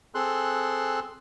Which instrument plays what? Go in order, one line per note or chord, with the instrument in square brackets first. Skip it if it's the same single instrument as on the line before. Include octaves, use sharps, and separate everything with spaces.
[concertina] C4 G#4 A4 C6 F#6